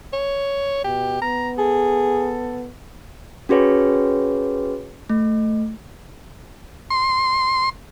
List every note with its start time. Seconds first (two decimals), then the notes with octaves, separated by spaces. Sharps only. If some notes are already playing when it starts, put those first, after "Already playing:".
0.13 C#5
0.84 B2 G4
1.22 B3 A#5
1.58 G#4 A4
3.49 C#4 F#4 G#4 B4 C#5
5.09 A3
6.90 C6